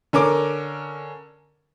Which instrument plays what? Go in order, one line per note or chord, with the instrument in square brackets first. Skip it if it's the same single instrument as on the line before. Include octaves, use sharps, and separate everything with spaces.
[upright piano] D3 C#4 A#4 D6